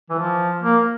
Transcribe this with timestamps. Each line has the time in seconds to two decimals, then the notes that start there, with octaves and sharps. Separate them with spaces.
0.10 E3
0.19 F3
0.63 A#3